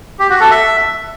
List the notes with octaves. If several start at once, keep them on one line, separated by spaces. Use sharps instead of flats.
G4
F#4
A4
E5